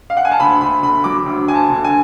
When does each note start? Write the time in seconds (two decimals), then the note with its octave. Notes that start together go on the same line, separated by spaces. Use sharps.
0.10 F5
0.17 F#5
0.25 G#5
0.32 A5
0.40 D2 B5
0.61 D2 B5
0.83 D3 B5
1.04 F#3 D6
1.26 D2
1.48 D2 G#5
1.55 A5
1.70 D3
1.84 G#5